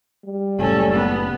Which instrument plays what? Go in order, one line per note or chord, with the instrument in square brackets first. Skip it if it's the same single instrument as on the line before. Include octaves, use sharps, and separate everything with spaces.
[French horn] G3
[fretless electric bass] F#1 A2 C#3 [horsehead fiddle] C#4 A4
[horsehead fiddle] B3